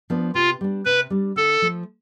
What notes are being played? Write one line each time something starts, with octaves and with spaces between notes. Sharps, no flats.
F3 B3 D4
C3 F4
G3 D4
C3 B4
G3 D4
D3 A4
F3 A3